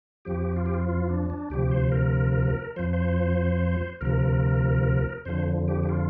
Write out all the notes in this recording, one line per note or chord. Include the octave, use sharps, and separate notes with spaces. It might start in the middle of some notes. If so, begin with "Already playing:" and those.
F2 F3 G4
F4
G4
F4
F4
D4
D4
D2 C3 F3 G4
C5
A#4
F2 F3 C5
C5
D2 C3 F3 A#4
F2 D3 F3 C5
G4
G4
F4